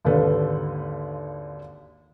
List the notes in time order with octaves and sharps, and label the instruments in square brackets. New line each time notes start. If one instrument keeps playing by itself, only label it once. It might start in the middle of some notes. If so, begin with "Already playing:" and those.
[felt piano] G#1 D#2 D3 A4 B4 F5